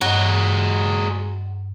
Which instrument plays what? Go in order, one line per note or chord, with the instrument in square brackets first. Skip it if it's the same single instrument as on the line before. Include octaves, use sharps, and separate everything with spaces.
[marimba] G2 [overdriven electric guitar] F#3 G#3 [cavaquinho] F#4 F#5